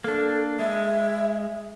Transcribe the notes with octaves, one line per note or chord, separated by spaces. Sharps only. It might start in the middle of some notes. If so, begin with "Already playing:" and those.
A#3 D4 A4
G#3 E5